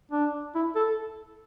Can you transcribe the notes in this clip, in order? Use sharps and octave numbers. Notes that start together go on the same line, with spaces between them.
D4
E4
A4